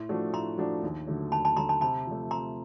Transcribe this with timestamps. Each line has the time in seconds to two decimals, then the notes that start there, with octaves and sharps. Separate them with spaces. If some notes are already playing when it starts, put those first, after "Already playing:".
Already playing: A2 C6
0.09 F3 A3 D4 F#4
0.33 A2 A#5 C6
0.58 F3 A3 D4 F#4
0.83 D#2
1.07 D3 F#3 A3
1.32 D#2 A5 B5
1.45 A5 B5
1.56 D3 F#3 A3 A#5 C6
1.69 A5 B5
1.81 C3 A5 B5
2.07 F3 A3
2.31 C3 A#5 C6